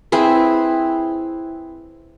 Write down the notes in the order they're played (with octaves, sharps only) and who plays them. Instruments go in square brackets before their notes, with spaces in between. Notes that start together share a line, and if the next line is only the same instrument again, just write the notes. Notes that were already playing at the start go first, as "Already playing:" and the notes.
[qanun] C4 E4 G#4 B4